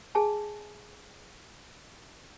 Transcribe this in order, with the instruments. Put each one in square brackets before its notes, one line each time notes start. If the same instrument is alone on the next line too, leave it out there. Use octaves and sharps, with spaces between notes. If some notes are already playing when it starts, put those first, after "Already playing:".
[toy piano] G#4 G#5 A5